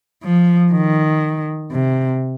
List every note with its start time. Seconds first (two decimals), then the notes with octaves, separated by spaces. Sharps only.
0.23 F3
0.73 D#3
1.72 C3